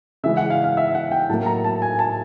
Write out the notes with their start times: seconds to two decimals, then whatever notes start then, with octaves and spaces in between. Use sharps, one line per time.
0.23 C#3 E3 G#3 E5
0.37 F#5
0.50 F5
0.64 F5
0.77 E5
0.95 F#5
1.11 G5
1.29 A2 F#3 A#3 A5
1.46 A#5
1.64 A5
1.82 G#5
1.99 A5